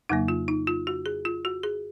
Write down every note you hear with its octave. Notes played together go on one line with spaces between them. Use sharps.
F2 C#3 F#3 A#3 D#4
F4
D#4
F4
F#4
G#4
F4
F#4
G#4